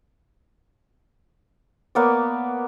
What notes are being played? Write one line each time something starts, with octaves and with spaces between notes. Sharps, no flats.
A#3 B3 C#5 D5